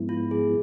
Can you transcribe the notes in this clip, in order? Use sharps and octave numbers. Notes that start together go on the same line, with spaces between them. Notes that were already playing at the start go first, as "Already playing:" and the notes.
Already playing: G#2 F3 G#3 B3 E4
F4
G#4